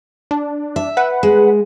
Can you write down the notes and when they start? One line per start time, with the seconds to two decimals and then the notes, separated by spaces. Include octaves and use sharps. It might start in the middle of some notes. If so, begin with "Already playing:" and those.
0.31 D4
0.76 E5
0.97 B4 F#5
1.23 G#3